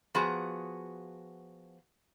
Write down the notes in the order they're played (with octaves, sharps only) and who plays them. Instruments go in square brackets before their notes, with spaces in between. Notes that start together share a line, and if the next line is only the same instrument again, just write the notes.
[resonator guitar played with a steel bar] F3 B3 F#4 G#4